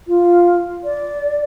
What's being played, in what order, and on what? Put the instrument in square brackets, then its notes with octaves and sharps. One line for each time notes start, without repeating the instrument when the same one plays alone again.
[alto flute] F4
D5